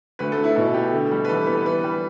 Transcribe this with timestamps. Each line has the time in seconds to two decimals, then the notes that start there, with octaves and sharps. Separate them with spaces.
0.19 D2 B4
0.32 A4
0.38 D3
0.44 E4
0.56 B2 E4
0.74 A3 G4
0.93 D3
1.11 G3
1.25 B4
1.29 E3 A4
1.47 B3 B4
1.66 E3 B4
1.84 G3